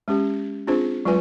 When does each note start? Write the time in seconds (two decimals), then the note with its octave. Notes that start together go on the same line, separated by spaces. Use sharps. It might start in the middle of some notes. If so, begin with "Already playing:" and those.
0.08 G#3 C#4 G4
0.67 C4 D4 F4 G#4 C5
1.05 F#3 G#3 F4 B4 G#5